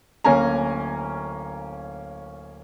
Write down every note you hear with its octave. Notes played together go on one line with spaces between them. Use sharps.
D1 A#3 C#4 G#5 A#5